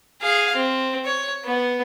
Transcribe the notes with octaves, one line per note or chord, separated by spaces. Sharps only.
G#4 F5
C4
C#5
B3